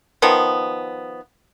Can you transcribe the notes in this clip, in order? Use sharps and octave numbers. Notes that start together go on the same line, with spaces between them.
D#3 F3 B3